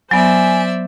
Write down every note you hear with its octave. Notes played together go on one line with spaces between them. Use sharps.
F#3 B3 C5 D5 E5 G#5